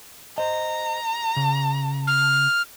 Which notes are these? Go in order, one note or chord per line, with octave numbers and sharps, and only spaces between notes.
C5 D#5 A#5
C#3
F6